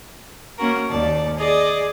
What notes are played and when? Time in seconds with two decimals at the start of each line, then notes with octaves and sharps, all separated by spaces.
0.57 A#3 C#4 F#4 A#4
0.89 D#2 D5 A5
1.36 G#4 D5 D#5